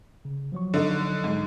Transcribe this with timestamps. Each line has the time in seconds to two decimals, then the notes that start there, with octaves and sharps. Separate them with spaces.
0.25 C#3
0.52 F3 F#3 C#6
0.74 D3 D#4
1.24 G#2